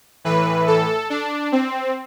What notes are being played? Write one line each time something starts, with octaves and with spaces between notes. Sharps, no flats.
A2 E3 B4
A4
D4
C4